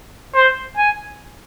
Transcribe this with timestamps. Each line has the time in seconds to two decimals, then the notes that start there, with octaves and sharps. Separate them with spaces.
0.34 C5
0.77 G#5